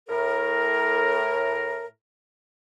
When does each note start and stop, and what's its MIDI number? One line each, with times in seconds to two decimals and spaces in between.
0.09 1.87 45
0.09 1.87 70